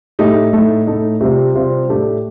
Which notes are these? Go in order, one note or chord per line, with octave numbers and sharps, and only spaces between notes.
A2 A3 D#4 G4
A2 A3 D#4
A2 A3 D#4
C3 G3 C4 F4
C3 G3 C4 F4
A2 A3 D4 G4